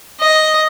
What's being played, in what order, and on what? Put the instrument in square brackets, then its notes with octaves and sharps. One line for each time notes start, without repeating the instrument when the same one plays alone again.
[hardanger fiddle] D#5